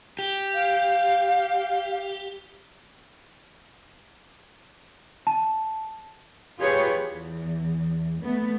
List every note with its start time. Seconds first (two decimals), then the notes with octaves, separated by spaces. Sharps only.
0.19 G4
0.55 F5
5.27 A5
6.60 F4 G4 G#4 B4 C#5
6.94 E2
8.23 A3 B3